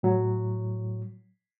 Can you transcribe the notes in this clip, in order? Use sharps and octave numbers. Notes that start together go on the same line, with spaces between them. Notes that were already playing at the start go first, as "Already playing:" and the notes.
A2 F#3